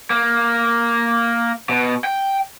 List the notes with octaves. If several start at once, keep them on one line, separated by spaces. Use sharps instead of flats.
A#3
B2
G5